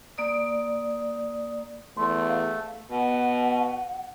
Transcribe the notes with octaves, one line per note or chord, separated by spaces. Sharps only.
A#3 D5 D#6
E2 A3 C6
F5
B2 F#5